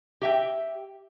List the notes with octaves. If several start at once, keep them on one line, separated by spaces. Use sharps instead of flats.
G4 E5 G5